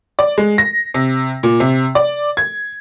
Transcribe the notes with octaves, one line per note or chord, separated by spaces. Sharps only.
D5
G#3
A#6
C3
A#2
C3
D5
G#6